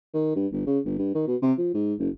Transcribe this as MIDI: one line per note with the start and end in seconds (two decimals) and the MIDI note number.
0.14 0.33 51
0.36 0.47 43
0.52 0.62 31
0.67 0.79 49
0.85 0.98 31
0.99 1.11 43
1.15 1.24 51
1.28 1.36 47
1.42 1.53 48
1.58 1.71 53
1.74 1.94 44
1.99 2.09 30